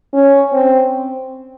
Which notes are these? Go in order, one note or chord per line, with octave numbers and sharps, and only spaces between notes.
C#4
C4